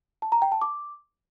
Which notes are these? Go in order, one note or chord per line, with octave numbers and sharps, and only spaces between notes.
A5
A#5
G5
A5
D6